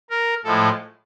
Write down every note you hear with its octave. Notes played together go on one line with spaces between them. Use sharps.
A#4
A2 F3 G#3 A4